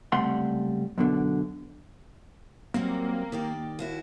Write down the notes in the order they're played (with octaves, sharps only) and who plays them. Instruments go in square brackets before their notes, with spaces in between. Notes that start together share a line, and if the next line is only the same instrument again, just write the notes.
[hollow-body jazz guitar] C#2 C3 G3 A3 F#5 C6
F#2 B2 D3
[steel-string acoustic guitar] F#3 G3 C4 [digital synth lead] A#3
[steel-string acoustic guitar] D#3 G4 D5
D#2 E4 F#4